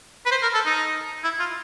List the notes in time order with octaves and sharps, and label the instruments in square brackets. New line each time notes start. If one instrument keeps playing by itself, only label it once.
[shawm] B4
C5
A#4
A4
D#4
E4
F4